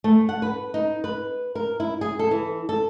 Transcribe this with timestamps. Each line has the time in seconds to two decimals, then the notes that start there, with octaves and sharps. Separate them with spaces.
0.04 A3
0.29 F#5
0.42 B4
0.74 D#4
1.04 B4
1.55 A#4
1.80 E4
2.01 G#4
2.19 A4
2.31 E3
2.69 A4